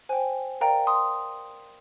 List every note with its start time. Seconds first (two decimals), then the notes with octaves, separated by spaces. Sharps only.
0.09 C5 G5 G#5
0.61 A#4 D5 F5 G5 A#5
0.87 C6 D#6